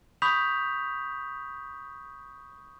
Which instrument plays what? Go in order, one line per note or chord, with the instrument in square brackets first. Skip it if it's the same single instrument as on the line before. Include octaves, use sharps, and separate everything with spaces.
[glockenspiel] B5 C#6 D#6 G6 B6 F7